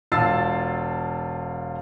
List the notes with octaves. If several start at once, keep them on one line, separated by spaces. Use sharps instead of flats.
E1 F4 A5 E6 A6 C7